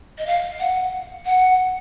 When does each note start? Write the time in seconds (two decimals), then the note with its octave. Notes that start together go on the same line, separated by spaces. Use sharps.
0.18 D#5
0.27 F5
0.59 F#5
1.25 F#5